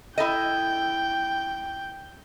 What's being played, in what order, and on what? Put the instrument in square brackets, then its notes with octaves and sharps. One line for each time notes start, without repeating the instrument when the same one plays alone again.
[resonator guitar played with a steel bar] E4 A4 D#5 [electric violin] G5